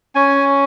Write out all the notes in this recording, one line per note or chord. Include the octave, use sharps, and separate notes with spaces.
C#4 G#5